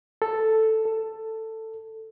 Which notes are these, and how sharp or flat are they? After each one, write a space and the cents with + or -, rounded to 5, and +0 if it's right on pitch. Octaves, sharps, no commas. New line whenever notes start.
A4 +0
A4 +10